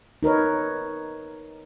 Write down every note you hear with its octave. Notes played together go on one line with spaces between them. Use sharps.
D#4 A#4 B4 C#5